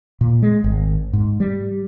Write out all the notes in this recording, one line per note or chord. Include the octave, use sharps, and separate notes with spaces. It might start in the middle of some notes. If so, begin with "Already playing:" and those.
A#2
G#3
G#1
G#2
G3